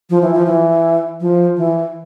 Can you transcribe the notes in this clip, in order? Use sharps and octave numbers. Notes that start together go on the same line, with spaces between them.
F3
E3
F3
E3
F3
E3